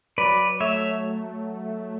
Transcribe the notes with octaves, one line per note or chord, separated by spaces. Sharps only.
F#3 B4 D5
A3 C#5 E5